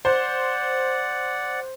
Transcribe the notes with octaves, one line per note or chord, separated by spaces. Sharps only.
C5 D5 F#5